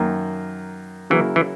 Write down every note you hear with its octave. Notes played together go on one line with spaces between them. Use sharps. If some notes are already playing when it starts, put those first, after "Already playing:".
Already playing: F#2 D#3 A#3
C#3 E3 F#3 A#3 E4
E3